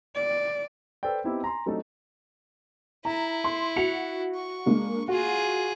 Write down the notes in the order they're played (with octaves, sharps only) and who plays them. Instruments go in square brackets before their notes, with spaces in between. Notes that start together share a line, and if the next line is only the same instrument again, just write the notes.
[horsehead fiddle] D5
[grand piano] A4 B4 C5 D5 G5
B3 C4 D#4 E4 G4
G#5 A#5 C6
F#3 A3 C4 D4 D#4 A4
[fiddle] E4 [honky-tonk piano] A#5
[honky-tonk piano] C6
F#4 C#7 F7
[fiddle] C#6
[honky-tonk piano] G#3 A#3 D4
[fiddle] F4 G#4 [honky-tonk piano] F#4